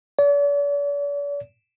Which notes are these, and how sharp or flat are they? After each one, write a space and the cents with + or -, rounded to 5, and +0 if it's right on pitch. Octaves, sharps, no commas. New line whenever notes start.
D5 -45